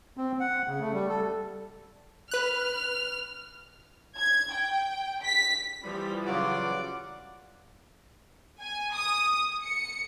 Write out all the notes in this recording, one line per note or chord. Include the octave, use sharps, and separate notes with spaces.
C4
F#5
C#3
A3
G3
A4
B4 F6 F#6
G#6
G5
B6
E3 F3 G3 B5
C#3 F#3 F4 D5 F#5 D6
G#5
D#6
C#7